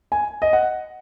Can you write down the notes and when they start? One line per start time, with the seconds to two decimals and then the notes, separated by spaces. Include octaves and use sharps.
0.12 G#5
0.42 D#5
0.53 F#5